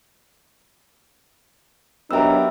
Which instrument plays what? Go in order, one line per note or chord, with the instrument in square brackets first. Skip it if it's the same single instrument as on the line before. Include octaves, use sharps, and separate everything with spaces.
[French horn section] F#3 D4 D#4 [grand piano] B3 G4 A#4 [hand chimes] E5 E6